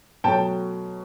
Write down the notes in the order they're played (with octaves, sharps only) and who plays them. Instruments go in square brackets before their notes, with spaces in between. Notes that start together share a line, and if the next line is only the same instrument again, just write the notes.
[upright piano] B2 F#3 A3 G5 A5